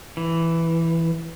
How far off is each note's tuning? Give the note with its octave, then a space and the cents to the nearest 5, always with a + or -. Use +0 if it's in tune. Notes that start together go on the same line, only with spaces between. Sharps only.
E3 +5